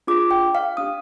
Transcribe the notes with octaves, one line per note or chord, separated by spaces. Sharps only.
D4 F4 G#4 D6
G5
F5
D4 G4 D#6